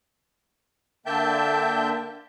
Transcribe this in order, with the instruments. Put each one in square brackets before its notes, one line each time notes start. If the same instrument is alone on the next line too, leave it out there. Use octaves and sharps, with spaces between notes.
[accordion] D3 A#3 E5 G5 A5 G6